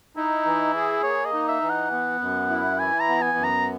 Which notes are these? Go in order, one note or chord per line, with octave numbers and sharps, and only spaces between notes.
D#4 E4
E3
G#4
A#3 C#5
D#5
D#4
E5
E3
F#5
B3
F#2
E4
E3 G#5
A#5
B3
G#5
F#2
A#5